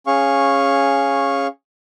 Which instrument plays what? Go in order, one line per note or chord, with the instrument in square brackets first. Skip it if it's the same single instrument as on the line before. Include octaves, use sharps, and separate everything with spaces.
[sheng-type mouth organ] C#4 G#4 F5 C#6